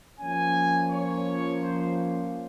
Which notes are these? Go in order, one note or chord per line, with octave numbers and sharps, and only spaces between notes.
F3 A#3 C#4 G#5
C#5
C5